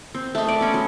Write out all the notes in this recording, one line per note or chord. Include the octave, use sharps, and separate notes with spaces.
C4
A3 D#5
D5
B3 C#4
F#3